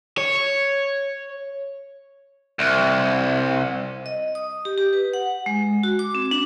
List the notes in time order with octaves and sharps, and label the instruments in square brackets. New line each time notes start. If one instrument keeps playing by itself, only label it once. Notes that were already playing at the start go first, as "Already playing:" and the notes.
[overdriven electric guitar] C#5
[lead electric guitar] C2
[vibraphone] D#5
D#6
G4
G4
B4
F#5
G#3
F#4
D6
C4
D4